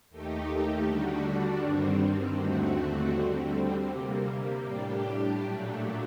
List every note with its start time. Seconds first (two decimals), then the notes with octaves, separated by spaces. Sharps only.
0.10 D#2 D#3 A3 D#4 G4
0.86 D3 G3 D4 F#4
1.61 G2 D#3 G3 C4
2.37 D#2 D3 A3 C4 F#4
3.13 D3 G3 C4
3.88 C3 G3 A#3
4.64 A2 G3 D4 G4
5.40 A#2 F#3 A3 D4